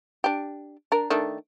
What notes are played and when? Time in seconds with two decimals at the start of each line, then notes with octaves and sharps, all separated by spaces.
0.24 D4 G4
0.92 D4 A#4
1.10 D#3 A3 D4